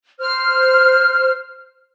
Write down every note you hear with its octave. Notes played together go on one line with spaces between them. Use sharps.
C5 F6